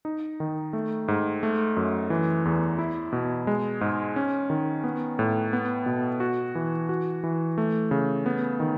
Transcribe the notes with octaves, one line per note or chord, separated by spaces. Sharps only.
D#4
D#3
A3
G#2
A3
F#2
E3
E2
E4
B2
G#3
G#2
C#4
D#3
B3
A2
B3
B2
F#4
E3
F#4
E3
A3
C#3
B3
D#3